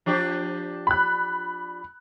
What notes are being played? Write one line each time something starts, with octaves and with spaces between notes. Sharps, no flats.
F3 D4 G4
B5 F#6